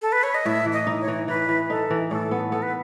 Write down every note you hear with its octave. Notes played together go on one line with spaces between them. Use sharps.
A4
B4
C#5
D#5
A2 E5
E3
D#5
D#4
C#5
E3
E3 B4
E3
D#4 A4
E3
A2 A4
B3
B3 A4
B4